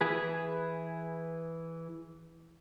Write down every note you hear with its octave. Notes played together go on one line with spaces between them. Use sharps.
E3 G#4 B4